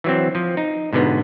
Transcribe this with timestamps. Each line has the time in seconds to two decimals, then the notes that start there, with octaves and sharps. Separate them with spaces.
0.04 E3 F#3 C4
0.35 F3
0.57 D#4
0.93 G#2 B2 D3 B3